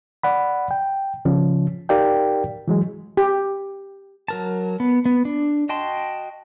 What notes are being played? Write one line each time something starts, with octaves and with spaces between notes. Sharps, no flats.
D5 F#5 B5
G5
C#3 F3 C#4
D#4 G4 A#4 D5 F5 G5
E3 F#3 G#3
G4
F#3 A#4 A5
B3
B3
D4
F#4 D#5 G5 A5 C6